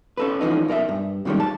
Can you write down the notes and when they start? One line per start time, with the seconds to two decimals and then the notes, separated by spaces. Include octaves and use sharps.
0.17 C#4 A4 B4
0.41 E3 F3 A#3 C#4 D#4
0.68 B1 A#4 D#5 E5
0.89 G2
1.25 F#2 A#2 D#3 G3 G#3 C#4
1.40 A5